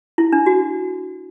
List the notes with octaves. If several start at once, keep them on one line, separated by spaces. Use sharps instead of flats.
E4
D4
F#4